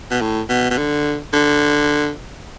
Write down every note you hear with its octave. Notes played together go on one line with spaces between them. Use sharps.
B2
A2
B2
B2
D3
D3